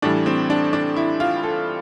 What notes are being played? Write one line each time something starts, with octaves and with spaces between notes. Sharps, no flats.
A2 E3 G3 D4
C4
D4
D4
E4
F4
A4